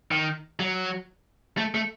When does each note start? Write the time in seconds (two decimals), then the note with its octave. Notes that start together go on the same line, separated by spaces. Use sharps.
0.11 D#3
0.59 F#3
1.58 A3
1.74 A3